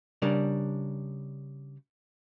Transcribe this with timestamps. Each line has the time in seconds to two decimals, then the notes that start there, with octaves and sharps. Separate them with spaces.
0.22 C#3 G3 D4 A#4 D5